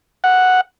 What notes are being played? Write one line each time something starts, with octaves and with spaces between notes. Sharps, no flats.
F#5